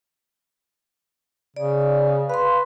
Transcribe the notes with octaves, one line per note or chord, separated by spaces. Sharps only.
C#3 D5
B4 F5 C6